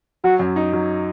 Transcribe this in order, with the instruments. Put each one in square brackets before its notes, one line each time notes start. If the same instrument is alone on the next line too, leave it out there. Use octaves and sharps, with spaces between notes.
[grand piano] F#3 [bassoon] F#4
[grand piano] F#2
D#4
F#3